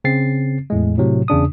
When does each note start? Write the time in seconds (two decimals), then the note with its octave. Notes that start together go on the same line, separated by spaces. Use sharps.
0.04 C#3 C4 A6 C7
0.70 E2 A2 G#3
0.98 A2 C3 F#3
1.28 E2 C#3 D4 D#6